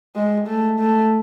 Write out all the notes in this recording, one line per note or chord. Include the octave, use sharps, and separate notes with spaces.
G#3
A3
A3